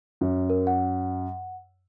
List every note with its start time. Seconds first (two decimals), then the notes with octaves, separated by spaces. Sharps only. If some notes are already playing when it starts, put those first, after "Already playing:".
0.21 F#2
0.50 A#4
0.67 F#5